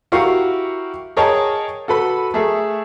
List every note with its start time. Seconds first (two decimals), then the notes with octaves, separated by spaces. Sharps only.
0.12 E4 F#4 G4 A#4 F5 C#6
1.17 G#4 A#4 C#5 D#5 G5 A5
1.88 F#4 A4 B4 B5
2.34 A3 G#4 A#4 E5